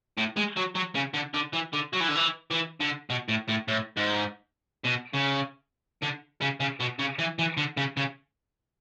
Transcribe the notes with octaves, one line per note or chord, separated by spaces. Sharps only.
A2
G#3
F#3
F#3
C#3
D3
D3
E3
D3
F#3
E3
D3
E3
E3
D3
B2
A2
A2
A2
G#2
B2
C#3
D3
C#3
C#3
B2
C#3
E3
E3
D3
C#3
C#3